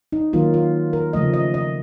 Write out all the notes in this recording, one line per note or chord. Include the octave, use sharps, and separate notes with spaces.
D#4
D#3 F#3 A#3 F4
F4
A#4
C#3 F3 A3 D#5
D#5
D#5